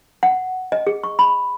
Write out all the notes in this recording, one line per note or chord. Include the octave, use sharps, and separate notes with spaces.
F#5
D#5
G#4
C#6
B5